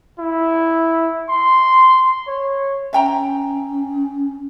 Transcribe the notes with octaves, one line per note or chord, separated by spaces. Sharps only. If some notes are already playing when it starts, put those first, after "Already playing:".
E4
C6
C#5
C#4 E5 G5 A#5